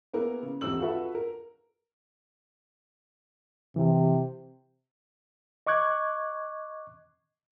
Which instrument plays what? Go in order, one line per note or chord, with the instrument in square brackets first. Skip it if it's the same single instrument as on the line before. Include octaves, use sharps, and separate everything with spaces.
[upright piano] A#3 B3 E4 G#4 A#4
C#3
D#1 E3 C4 E6 F#7
F4 F#4 A4 B4 E5
A#4
[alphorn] C3 [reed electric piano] E3
[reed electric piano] D#5 C#6 D6 F#6 G#6